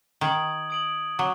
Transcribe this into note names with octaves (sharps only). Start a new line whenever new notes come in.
D#3 D#6 G#6 D7 F#7
D#6 G#6 D7 F#7
F#3 D6